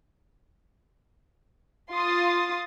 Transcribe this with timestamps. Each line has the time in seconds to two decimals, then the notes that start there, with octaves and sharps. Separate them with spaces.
1.91 F4 C6 D#6 A6